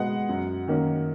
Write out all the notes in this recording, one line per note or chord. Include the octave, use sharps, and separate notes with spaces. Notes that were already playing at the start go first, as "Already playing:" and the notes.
Already playing: B2 G#3 B3 F#5
F#2
D#3 A#3 C#4